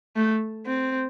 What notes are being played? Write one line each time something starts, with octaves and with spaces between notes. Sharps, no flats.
A3
C4